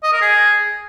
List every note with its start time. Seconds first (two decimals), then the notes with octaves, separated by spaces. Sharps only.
0.04 D#5
0.13 A#4
0.22 G#4